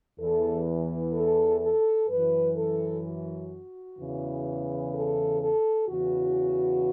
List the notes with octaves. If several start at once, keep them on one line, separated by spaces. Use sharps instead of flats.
E2 E3 A4
A4
A4
F#2 E3 B4
A4
F#4
E2 C#3 E3
A4
A4
E2 C#3 E3 F#4